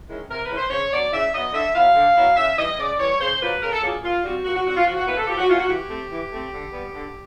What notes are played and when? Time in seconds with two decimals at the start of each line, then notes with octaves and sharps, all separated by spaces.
0.08 D#3 G#3 C#4 E4
0.29 C3 A#4
0.43 B4
0.50 D#3 G#3 C#4 E4
0.56 C5
0.70 C#3 C#5
0.91 F#3 B3 D5
1.12 C#3 E5
1.33 F#3 B3 D#5
1.53 D3 E5
1.74 F#3 B3 E4 F5
1.95 D3
2.16 F#3 B3 E4
2.36 C#3 E5
2.57 E3 G3 D#5
2.78 C#3 D5
2.99 E3 G3 C#5
3.20 C#3 C5
3.41 F#3 A#3 D4 F4 B4
3.61 C#3 A#4
3.72 A4
3.82 F#3 A#3 D4 F4 G#4
4.03 A#2 F4
4.23 G3 C4 F#4
4.44 A#2 F#4
4.55 F#4
4.65 G3 C4 F#4
4.75 F4
4.86 F3 F#4
4.97 F#4
5.06 A#3 C#4 E4 B4
5.17 A4
5.27 F3 G4
5.38 F#4
5.48 A#3 C#4 E4 F4
5.58 F#4
5.69 E3 G4
5.89 A3 C4
6.11 E3
6.31 A3 C4
6.52 D3
6.73 G3 B3
6.93 D3